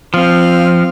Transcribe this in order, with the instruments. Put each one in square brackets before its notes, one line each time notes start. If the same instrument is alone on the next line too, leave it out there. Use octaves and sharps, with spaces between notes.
[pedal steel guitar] F3 [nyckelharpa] C4 F5